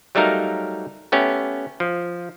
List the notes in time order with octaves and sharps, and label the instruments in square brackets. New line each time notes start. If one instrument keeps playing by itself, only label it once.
[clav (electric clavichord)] F#3 G3 A3 D#4 A#4 F5
A3 B3 C#4 G4
F3